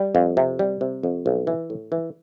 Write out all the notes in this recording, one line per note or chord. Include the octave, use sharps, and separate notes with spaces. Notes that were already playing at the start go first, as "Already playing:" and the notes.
Already playing: G3
F2
C3
G3
C3
F2
B1
E3
A2
E3